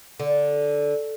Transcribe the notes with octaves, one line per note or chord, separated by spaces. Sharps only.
D3